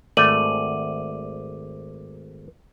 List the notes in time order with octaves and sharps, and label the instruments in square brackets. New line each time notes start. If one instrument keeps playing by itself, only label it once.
[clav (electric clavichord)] G#1 A3 D5 [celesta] D6 D#7 F#7